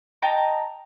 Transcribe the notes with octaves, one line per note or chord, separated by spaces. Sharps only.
D#5 G5 A5 A#5